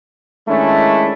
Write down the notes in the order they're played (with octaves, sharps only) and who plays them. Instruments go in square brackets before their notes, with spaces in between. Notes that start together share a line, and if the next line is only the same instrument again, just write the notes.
[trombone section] D#3 G#3 A3 C#4 D4 E4